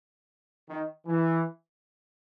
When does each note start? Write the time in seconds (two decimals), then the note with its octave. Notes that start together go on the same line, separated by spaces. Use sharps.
0.69 D#3
1.06 E3